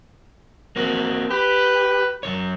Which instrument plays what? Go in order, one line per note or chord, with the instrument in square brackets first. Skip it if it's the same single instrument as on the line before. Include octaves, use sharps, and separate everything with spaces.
[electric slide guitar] A#3 C4 F#4
[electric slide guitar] G4 [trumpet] B4
[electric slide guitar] F#2 B2 C#5